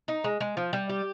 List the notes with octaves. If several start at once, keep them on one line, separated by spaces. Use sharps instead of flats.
D#4
G#3
G#3
F3
G3
G4